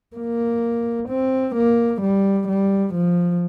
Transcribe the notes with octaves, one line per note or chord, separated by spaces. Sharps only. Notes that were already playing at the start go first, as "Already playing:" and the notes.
A#3
C4
A#3
G3
G3
F3